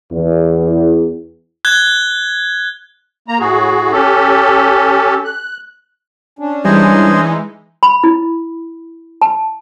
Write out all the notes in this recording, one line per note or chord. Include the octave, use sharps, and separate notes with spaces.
E2
F#6 G#6 G7
A#3 A#5
A2 F#4 G#4
C#4 G4 A4
F#6
C#4 D4
E3 G3 G#3 D#4 C5 D#5 G#5
B5
E4
A5